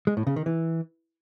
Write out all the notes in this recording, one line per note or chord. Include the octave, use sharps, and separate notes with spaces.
G#3
A2
C#3
D#3
E3